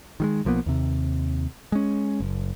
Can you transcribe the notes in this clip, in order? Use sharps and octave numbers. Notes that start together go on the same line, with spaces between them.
D#3 G3 G#3
B1 F3 A#3 B3
D#2 C3
G#3 C#4
F#1